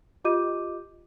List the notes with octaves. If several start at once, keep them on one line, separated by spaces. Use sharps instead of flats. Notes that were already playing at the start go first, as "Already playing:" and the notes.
F4 G4 D#5 D6 G6 D#7